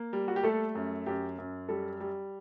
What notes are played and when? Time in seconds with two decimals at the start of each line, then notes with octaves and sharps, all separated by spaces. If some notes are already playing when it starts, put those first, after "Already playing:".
Already playing: A#3
0.13 G3
0.28 F#4
0.36 G4
0.43 A3 A4
0.75 F#2
1.06 F#2 G4
1.38 F#2
1.69 G3 A4
2.00 G3